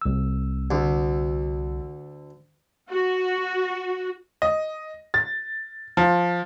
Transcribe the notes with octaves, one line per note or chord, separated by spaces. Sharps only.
C2 E6
D2
F#4
D#5
A6
F3